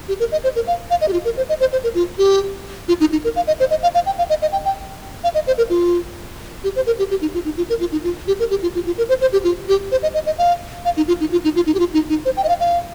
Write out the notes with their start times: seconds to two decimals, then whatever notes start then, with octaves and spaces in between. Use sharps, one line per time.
0.08 G4
0.20 A#4
0.32 D#5
0.44 C5
0.55 A#4
0.67 F5
0.90 F5
1.01 D#5
1.08 G4
1.13 F4
1.25 A#4
1.37 C5
1.49 D#5
1.60 C5
1.72 C5
1.84 A#4
1.95 F4
2.18 G4
2.88 F4
3.00 D#4
3.12 D#4
3.24 A#4
3.36 F5
3.47 D#5
3.60 C5
3.70 D#5
3.83 F5
3.95 F5
4.06 G5
4.18 F5
4.30 D#5
4.42 D#5
4.52 G5
4.65 G5
5.24 F5
5.35 D#5
5.47 C5
5.58 A#4
5.70 F4
6.64 G4
6.76 C5
6.86 A#4
6.99 G4
7.11 G4
7.22 D#4
7.34 F4
7.45 D#4
7.57 F4
7.69 A#4
7.80 F4
7.92 D#4
8.04 F4
8.28 G4
8.40 A#4
8.50 G4
8.62 F4
8.75 F4
8.86 F4
8.98 A#4
9.09 C5
9.21 C5
9.32 G4
9.44 F4
9.68 G4
9.92 C5
10.03 D#5
10.14 D#5
10.26 D#5
10.38 F5
10.85 F5
10.97 D#4
11.08 F4
11.20 D#4
11.32 F4
11.44 D#4
11.56 F4
11.66 D#4
11.75 G4
11.79 F4
11.94 D#4
12.09 D#4
12.25 C5
12.37 G5
12.44 D#5
12.49 F5
12.60 F5